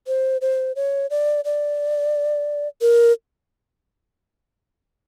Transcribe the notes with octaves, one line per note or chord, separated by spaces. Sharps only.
C5
C5
C#5
D5
D5
A#4